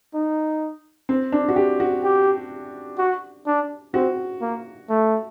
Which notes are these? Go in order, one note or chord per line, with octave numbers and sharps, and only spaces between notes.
D#4
C4
D4
F#4
G4
F#4
G4
F#4
D4
C4 F#4
A#3
A3